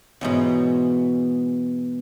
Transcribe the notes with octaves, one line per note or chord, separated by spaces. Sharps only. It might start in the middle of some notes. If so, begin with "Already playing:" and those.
E2 G#2 B2